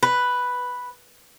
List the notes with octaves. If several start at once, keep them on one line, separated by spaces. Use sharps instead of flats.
B4